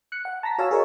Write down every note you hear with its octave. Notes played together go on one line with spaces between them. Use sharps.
F#6 C#7
F#5
A5 A#5 A#6 B6
F#4 C#5 F5 G#5 A5 E6
G#4 A#4 C#5 D#5 C#6